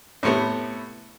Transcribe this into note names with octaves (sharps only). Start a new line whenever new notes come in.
A2 C3 A3 B3